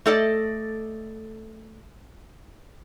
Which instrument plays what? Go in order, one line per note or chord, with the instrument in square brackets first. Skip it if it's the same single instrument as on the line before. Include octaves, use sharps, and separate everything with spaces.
[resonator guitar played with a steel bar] A3 A4 D5 D#5